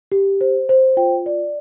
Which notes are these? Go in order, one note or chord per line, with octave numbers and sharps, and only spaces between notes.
G4
C5
C5
F4 G5
D5